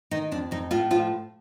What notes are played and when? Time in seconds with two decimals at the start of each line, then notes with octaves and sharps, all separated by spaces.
0.11 D#3 D#4
0.32 F2 D4
0.51 F2 D#4
0.71 A2 F4
0.91 F3 F4